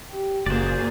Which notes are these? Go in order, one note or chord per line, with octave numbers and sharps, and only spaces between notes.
G4
F#1 A#2 A#3 F#4 G#4 C5 D5